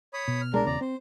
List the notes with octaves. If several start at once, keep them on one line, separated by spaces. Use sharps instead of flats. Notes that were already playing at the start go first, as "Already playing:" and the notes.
C#5 B5 D#6
B2
F6
C2 G#3 D4 A#4
E1 E2 C#3 D5 A#5
C4 C5